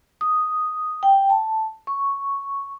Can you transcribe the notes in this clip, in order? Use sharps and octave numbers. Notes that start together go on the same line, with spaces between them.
D#6
G5
A5
C#6